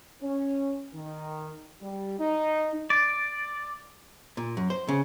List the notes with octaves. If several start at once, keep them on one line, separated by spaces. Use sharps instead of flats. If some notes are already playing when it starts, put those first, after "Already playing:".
C#4
D#3
G3
D#4
D5
A#2
F#2
C5
C#3